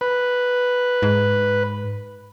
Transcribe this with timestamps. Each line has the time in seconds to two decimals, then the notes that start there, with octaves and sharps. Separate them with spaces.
0.01 B4
1.02 G#2